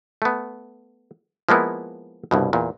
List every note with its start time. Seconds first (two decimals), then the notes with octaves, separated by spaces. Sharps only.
0.22 A3 B3
1.49 F3 G#3 A#3 B3 E4
2.31 C2 G2 B2
2.53 E2 A#2